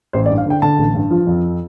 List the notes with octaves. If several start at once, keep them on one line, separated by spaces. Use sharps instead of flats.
A1 C5
D5
G2
F5
D3 G5
D3 A5
A1
G2
F3
F2